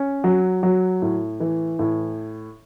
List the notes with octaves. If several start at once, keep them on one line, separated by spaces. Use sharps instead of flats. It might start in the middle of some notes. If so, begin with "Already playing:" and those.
Already playing: C#4
F#3
F#3
A2
E3
A2